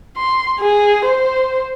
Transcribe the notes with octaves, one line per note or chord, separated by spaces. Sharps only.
C6
G#4
C5